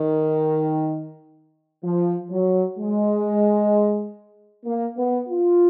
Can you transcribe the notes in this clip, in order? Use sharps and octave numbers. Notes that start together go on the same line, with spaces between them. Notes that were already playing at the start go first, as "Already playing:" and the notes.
Already playing: D#3
F3
F#3
G#3
A#3
B3
F4